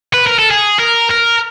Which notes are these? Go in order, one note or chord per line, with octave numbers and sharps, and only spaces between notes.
B4
A#4
A4
G#4
A#4
A#4